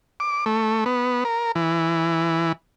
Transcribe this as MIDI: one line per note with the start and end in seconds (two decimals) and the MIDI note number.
0.20 0.45 86
0.46 0.84 57
0.86 1.24 59
1.25 1.52 70
1.55 2.52 52